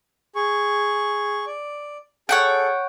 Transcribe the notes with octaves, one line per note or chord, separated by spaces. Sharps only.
G#4 C#6
D5
G#4 A4 C#5 F#5 G5